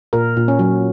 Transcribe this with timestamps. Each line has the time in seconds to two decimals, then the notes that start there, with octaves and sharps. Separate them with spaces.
0.13 A#2 A#4
0.37 A#2
0.48 C#4
0.59 F#3